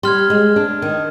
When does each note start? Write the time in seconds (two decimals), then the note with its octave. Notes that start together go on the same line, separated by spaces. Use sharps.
0.03 G3 C6 F6 G#6
0.30 G#3
0.56 D4
0.82 D#3